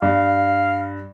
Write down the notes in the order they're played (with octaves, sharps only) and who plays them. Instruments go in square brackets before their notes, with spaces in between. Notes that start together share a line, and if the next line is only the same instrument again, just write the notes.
[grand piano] G2 [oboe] F5